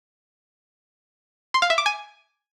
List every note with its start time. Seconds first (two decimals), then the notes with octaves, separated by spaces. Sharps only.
1.54 C6
1.62 F5
1.70 E5
1.78 D6
1.86 G#5